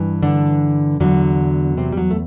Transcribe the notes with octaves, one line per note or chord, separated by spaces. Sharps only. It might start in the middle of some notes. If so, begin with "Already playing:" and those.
Already playing: G2 E3
D3 D4
E2 D3 F#3
C3 C4
G3
F#3
A3